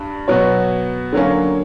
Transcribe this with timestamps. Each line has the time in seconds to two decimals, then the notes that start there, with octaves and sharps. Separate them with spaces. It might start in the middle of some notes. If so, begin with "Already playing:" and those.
Already playing: G2 G3
0.28 B2 F#3 B3 F#4 C#5
1.13 D3 F#3 A#3 C#4